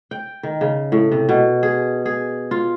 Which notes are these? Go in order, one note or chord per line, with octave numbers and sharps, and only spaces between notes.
G5
D#3
C#3
A2
C3
B2
G#4
G#4
F4